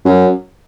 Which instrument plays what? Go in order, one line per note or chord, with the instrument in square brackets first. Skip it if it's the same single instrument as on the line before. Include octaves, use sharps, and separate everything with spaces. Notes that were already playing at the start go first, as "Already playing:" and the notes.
[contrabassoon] F#2